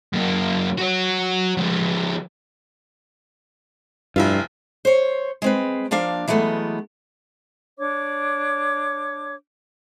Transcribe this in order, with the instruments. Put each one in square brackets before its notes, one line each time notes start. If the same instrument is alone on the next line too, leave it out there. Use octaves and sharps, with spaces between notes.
[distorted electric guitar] F#2 A#3
F#4 C#5
F3 G#3
[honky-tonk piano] F1 E4 F4 [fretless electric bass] G2
[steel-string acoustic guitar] C5 C#5
G#3 C4 B4
F3 A#3 D4 F5
E3 F#3 G#3 A3 B3
[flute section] D4 C#5 D6